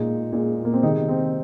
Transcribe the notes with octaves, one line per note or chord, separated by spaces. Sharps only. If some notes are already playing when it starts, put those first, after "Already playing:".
Already playing: A#2 G#3 D#4
A#2 G#3
A#3
C4
C3 D#3 G#3 D#4
C4